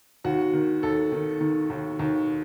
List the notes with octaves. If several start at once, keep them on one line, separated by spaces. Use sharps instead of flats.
D#2 F#4
D#3
D#2 A4
D#3
D#3
D#2
D#2